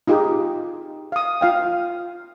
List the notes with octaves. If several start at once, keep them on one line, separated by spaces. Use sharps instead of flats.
D#4 F4 G4 G#4
F5 D#6
F4 F5 G5